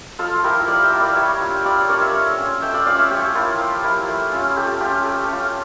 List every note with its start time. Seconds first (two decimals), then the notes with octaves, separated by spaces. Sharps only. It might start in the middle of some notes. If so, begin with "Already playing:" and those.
0.19 F3 F4 A4
0.43 A#3 E4 G4 A#4
0.67 F3 D5 F5
0.83 E5 G5
0.92 A#3 E4
1.00 D5 F5
1.16 G3 C#5 E5
1.41 D4 F4
1.55 G5
1.64 G3 D5 F5
1.81 C#5
1.89 D4 F4 A#4 D5
2.01 C#5 E5
2.14 A3
2.38 C#4 F4
2.62 A3 E5 G5
2.74 D5 F5
2.86 C#4 F4 D5 F5
2.98 C#5 E5
3.10 F3 G4
3.35 A#3 E4 F4
3.59 F3
3.84 A#3 E4
4.08 A3
4.32 C#4 F4
4.57 A3 G4
4.80 C#4 F4 G4
5.05 A3
5.29 C#4 F4